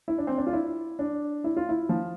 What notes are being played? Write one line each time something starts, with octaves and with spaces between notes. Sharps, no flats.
E4
D4
C4
D4
F4
E4
D4
E4
F4
E4
F3